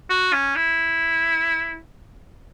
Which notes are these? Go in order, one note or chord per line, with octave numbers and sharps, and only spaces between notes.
F#4
C#4
E4